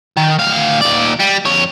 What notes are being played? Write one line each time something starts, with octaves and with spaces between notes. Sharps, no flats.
D#3
D2 F5
D#2 D5
G3
F2 C#5